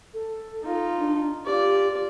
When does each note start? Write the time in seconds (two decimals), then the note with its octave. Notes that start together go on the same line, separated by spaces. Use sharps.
0.14 A4
0.62 D#4 F4
0.98 D4
1.46 F4 G4 D5